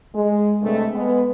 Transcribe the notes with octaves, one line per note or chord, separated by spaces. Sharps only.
G#3
G2 C3 G#3 A3
G#3 B3